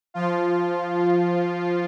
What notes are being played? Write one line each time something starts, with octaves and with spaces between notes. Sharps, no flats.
F3 F4